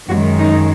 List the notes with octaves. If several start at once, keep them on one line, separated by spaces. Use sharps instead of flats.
F#2 D#3 G#3 F#4
D#4